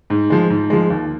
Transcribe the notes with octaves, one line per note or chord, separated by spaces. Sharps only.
G#2
F3 G#3
G#2
F3 G#3
D#2